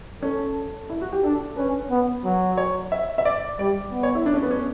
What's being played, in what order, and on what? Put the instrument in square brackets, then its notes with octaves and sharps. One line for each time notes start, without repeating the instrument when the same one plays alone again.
[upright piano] C#4 [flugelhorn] A4
[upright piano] E4
F#4
G4
[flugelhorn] D4 [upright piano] A4
[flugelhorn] C#4 [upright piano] B4
[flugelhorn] B3
F#3
[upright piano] C#5
E5
E5
D5
[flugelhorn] G3 [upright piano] D5
[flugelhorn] B3
[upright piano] C#5
E4
D4
C#4
B3
C#4